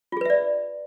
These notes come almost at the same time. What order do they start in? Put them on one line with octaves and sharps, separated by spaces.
F4 G#4 B4 E5 D5